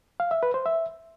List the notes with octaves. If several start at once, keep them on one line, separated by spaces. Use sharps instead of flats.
F5
E5
B4
C5
E5